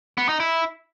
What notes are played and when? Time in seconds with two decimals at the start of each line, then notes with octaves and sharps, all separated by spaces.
0.18 B3
0.29 D#4
0.40 E4